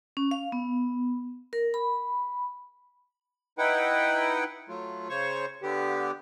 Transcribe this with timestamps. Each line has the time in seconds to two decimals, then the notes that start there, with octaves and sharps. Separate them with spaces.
0.17 C#4
0.31 F5
0.52 B3
1.53 A#4
1.74 B5
3.58 D#4 E4 B4 F#5 G5
4.69 F#3 A3 F4
5.09 C#3 C5 C#5 C#6
5.62 D3 B3 G4